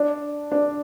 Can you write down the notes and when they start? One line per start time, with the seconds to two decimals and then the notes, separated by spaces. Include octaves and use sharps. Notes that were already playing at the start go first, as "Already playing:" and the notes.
Already playing: D4
0.52 D4